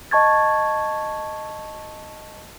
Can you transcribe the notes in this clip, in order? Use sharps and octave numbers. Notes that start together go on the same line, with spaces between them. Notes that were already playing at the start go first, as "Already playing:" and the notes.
D#5 A5 C#6 G#6 A6